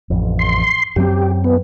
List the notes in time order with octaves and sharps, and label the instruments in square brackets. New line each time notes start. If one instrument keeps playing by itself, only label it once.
[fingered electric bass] A1 F2
[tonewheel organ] C6
[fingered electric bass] F#2 F#3 C4 [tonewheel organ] G4
[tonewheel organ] B3